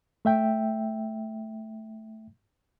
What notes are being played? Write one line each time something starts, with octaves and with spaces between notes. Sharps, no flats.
A3 E5 G5